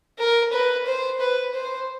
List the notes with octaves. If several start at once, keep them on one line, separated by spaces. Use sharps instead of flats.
A#4
B4
C5
B4
C5